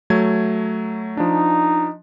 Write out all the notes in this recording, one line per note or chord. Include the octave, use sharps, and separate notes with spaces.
F#3 A3 G#6
F3 D4 D#4